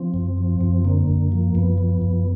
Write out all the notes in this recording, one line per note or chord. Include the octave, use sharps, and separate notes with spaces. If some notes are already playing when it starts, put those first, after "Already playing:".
Already playing: F3 C4
F#2
F3
F#2
D3 A#3
F#2
F3
F#2 B3
F3
F#2